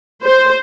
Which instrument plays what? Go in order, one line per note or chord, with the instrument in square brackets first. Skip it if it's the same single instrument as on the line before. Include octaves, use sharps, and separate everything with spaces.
[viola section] C5